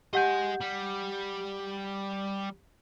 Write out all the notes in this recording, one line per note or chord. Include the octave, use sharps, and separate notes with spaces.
G4 D#5 F#5 G#5 G6
G3